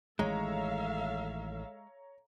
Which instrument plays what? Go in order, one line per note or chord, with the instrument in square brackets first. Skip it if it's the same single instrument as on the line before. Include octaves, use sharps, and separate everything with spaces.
[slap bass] A1 D#3 [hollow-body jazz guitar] G#3 [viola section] A4 E5 F5 [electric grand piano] C#5 A#5